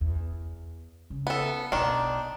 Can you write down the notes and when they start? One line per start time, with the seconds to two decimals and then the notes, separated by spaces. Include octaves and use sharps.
0.01 E2
1.10 C#3
1.27 B3 A4
1.72 B1 B2 D#3 D4